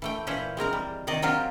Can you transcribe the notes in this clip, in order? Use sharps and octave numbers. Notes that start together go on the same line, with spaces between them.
E3 A3 G5
A#2 E3 C#4 B4 C5
G#3 C4 A#4 A#5
G3
C3 D#3 D5 D#5
F#3 C4 F4 G4 A#4